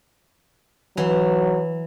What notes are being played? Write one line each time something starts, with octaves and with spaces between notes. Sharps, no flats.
E3 F#3